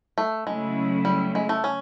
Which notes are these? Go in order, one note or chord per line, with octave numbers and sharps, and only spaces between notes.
A3
C#3 F#3 G#3 A3 C#4 E4
G3
G#3
A3
C#4